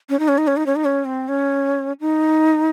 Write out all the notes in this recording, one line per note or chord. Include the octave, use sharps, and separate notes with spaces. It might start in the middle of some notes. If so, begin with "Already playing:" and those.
C#4
D#4
C#4
D#4
C#4
D#4
C#4
D#4
C#4
C4
C#4
D#4